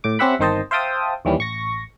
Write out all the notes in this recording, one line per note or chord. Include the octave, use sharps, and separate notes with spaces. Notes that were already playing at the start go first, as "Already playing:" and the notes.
A2 D6
C4 C#4 G4 E5 F#5 B5
G1 D#3 C4 C5 D#5 A5
C5 E5 F5 G5 A5 D#6
D#2 E3 G3 C#4
A1 C#6 A#6